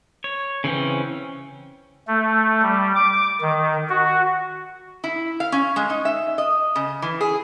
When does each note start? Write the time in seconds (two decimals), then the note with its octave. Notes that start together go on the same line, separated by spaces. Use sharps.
0.24 C#5
0.64 C#3 E3 C4 C#4
2.07 A3
2.62 G3
2.95 D6
3.41 D#3
3.90 F#4
5.04 E4
5.40 F5
5.52 C#4
5.76 G#3
5.90 D#4
6.05 E5
6.38 D#5
6.76 C#3
7.02 E3
7.21 G#4